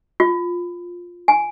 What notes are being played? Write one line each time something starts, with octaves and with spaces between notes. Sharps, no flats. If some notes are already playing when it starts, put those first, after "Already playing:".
F4
G#5